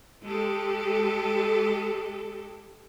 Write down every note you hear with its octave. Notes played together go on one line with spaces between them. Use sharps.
G#3 G4 A4